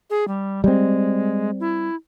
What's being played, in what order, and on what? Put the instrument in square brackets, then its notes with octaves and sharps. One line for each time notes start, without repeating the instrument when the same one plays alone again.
[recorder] G#4
G3
[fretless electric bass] G3 C4 [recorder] G#3
[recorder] E4